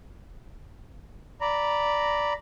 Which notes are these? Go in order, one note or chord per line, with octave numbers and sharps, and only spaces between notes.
D5 A#5 B5